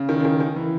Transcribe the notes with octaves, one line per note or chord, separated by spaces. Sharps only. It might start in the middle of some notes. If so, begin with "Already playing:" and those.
Already playing: C#3
D#3
C#3
D#3
D#3
E3